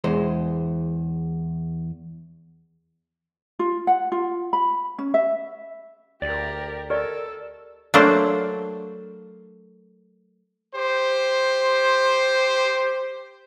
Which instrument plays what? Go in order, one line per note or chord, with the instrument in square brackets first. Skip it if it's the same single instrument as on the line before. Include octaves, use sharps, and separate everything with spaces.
[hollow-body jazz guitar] E2 G#3 C5
[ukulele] F4
F#5
F4
B5
C#4
E5
[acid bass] D2 [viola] G4 A#4 [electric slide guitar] D5
[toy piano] G4 D5 D#5 [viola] A4 [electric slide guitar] A#4
[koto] F#3 A3 A#3 D4 C5
[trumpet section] G4 C5